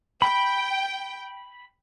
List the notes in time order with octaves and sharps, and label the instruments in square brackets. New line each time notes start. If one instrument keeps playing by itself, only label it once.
[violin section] G5 [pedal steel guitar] B5